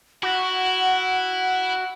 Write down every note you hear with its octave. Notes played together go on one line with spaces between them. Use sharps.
E4 F#4 F#5